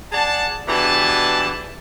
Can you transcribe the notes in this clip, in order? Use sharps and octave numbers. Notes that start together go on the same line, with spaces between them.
G#4 D5 F#5 A5
B2 E3 D4 G4 G#4 A5